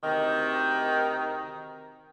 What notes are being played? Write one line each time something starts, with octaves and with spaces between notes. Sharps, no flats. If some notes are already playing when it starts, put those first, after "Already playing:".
D2 C3 D#3